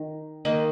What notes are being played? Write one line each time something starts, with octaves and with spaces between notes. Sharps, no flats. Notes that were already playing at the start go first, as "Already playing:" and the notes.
Already playing: D#3
D#3 A#3 D#4